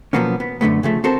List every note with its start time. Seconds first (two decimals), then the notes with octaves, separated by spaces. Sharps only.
0.13 B2 F3 F#3 A#3 B3 C#4
0.40 B3
0.61 F#2 D3 A3 B3
0.83 C#3 F3 A3
1.04 C4 F#4 A4 A#4 C5